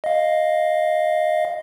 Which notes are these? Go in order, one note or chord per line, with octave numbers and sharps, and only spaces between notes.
D#5 F5